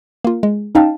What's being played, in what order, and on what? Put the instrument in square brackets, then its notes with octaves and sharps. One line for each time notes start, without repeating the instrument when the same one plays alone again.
[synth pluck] A#3 F4
G#3
C#4 D#4 F5 G5 A5